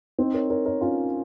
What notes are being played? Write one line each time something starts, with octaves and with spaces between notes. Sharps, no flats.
C4 D#4
A#4 C#5
A#4 C#5
A#4 C#5
C#4 F4